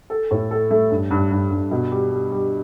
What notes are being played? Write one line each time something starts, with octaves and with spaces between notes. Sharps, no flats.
A4
A2
A4
A3
G2
G2
G2
G2
B2
G3
G3
G3